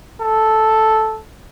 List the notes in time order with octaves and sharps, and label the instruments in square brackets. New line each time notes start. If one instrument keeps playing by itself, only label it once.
[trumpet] A4